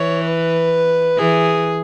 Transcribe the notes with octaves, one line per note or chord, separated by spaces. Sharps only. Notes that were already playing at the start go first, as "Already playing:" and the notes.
Already playing: E3 C#5
B4
E3 G#4